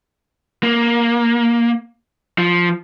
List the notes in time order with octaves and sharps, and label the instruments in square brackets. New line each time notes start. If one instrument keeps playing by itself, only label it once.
[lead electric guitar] A#3
F3